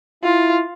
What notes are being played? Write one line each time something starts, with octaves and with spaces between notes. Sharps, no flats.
E4 F4